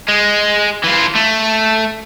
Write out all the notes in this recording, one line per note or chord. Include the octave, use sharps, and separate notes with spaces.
G#3
E3 F4
A3